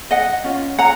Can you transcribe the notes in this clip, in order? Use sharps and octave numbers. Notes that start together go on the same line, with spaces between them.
D#5 F#5
C#4 F4
F#5 A#5